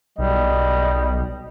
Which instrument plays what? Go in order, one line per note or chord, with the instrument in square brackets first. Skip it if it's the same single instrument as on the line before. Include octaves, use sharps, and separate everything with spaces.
[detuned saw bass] B1 [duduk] G3 [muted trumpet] D#5